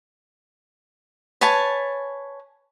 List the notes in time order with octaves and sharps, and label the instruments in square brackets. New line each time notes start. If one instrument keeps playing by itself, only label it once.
[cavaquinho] B4 C#5 G#5 A5